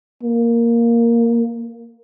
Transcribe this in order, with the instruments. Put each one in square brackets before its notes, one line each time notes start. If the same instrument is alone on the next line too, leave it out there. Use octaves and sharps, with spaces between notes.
[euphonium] A#3